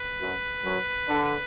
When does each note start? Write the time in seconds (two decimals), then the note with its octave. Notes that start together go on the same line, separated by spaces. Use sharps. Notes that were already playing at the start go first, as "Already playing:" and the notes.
Already playing: B4
0.21 F#2 F#3
0.64 F#2 F#3
1.08 D3